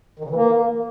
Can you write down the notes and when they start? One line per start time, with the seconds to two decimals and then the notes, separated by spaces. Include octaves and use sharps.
0.19 D#3
0.25 C#3
0.30 E3
0.35 A#3